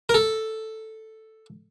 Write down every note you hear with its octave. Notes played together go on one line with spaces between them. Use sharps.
A#4
A4